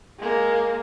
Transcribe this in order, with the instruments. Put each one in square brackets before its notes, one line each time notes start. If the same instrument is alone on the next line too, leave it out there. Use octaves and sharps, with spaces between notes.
[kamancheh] G#3 A#3